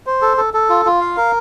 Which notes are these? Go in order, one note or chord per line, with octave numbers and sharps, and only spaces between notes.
C5
A4
A4
A4
F4
F4
F5
A#4